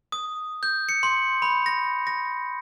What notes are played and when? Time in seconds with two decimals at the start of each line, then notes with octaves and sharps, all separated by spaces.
0.12 D#6
0.63 G6
0.89 C#7
1.03 C6
1.42 B5
1.66 A#6
2.07 A#6